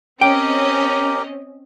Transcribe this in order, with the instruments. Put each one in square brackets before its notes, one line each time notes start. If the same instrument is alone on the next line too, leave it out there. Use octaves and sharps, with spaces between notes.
[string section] C4 C#4 D#5 [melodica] G4 A#4 [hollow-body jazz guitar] G5